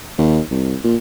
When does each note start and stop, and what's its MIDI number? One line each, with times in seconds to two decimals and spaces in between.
0.18 0.40 39
0.51 0.76 36
0.84 0.96 46